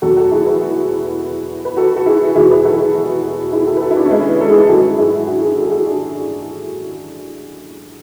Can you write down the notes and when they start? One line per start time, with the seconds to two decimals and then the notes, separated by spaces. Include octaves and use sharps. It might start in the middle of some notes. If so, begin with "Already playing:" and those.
0.02 E2 B2 F#3 F#4 A4
0.16 F#4 A4
0.31 E4 G#4
0.46 G#4 B4
1.65 B4
1.77 F#4 A4
1.96 F#4
2.06 E4 G#4
2.35 E2 B2 F#3 E4 G#4
2.50 G#4 B4
2.65 F#4 A4
2.79 E4 G#4
3.52 E4 G#4
3.67 F#4 A4
3.77 B4
3.82 F#4 A4
3.91 E4
3.96 D4 F#4
4.05 C#4
4.11 G#3 B3
4.41 A4
4.49 E4 G#4
4.69 G#2 F#3 F#4 A4
4.98 E4 G#4
5.27 D4 F#4
5.42 E4 G#4
5.57 F#4 A4
5.67 G#4
5.71 F#4 A4
5.86 D4 F#4